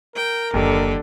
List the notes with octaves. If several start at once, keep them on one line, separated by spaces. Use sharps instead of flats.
A#4 G5
F#1 D#2 D3